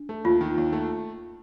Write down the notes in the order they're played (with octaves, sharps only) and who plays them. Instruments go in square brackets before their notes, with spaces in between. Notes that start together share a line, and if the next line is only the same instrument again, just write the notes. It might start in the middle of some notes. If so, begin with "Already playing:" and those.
Already playing: [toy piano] D4
[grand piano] A3
[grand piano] D#2 [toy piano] F4
[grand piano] D#3
D#2
A3